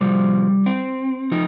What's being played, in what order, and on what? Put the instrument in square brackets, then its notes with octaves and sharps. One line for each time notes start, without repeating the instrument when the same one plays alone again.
[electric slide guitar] C3 F3 G3
C4
F3 D#4